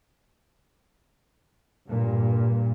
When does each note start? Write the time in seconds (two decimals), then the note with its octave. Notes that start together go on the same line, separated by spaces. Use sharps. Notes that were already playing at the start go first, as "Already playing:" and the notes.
1.87 G2 A#2